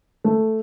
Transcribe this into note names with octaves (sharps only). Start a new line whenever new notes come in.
A3